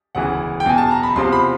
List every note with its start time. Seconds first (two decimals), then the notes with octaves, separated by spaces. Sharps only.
0.15 E1 D2 C#3 E3 F#5
0.60 G5
0.66 E2 B2 G#5
0.78 A5
0.91 A#5
1.03 B5
1.16 E2 C3 F3 C6
1.33 B5